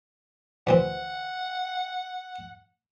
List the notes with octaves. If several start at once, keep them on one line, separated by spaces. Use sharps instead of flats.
D2 E3 C4 F#5